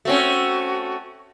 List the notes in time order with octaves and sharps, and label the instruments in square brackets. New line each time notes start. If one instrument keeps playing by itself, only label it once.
[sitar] A3 C4 C#4 [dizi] F#4